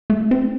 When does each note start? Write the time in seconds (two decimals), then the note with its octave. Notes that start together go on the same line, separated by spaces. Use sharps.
0.10 A3
0.31 C4